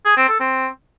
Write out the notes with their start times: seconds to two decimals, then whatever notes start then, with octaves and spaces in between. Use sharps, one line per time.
0.05 G#4
0.17 C4
0.29 A4
0.40 C4